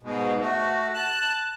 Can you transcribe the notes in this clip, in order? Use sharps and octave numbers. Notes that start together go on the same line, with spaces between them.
G#2 B2
A3 F#4
A5 F#6